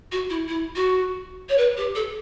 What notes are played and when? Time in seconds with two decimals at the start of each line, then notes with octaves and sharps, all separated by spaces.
0.12 F#4
0.30 E4
0.49 E4
0.76 F#4
1.49 C#5
1.58 B4
1.77 G4
1.95 A4